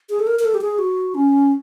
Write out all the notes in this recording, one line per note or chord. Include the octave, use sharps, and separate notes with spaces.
G#4
A4
A#4
A#4
A4
G4
G#4
F#4
C#4